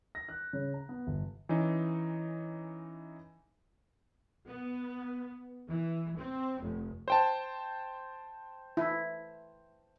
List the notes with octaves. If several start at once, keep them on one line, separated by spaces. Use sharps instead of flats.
A#6
F#6
C#3
A#5
B3
G1
E3 C#4 D#4
B3
E3
C4
F1
C5 G5 A5
E4